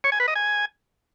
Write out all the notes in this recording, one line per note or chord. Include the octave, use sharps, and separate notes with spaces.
C#5
G#5
B4
D#5
G#5